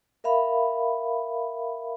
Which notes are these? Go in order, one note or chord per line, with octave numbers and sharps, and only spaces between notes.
A#4 E5 F5 B5